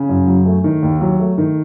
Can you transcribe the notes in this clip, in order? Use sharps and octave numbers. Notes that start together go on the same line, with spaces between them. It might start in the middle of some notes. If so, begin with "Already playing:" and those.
Already playing: C#3
F#2
F#3
A3
D#3
D#2
F#3
A3
D#3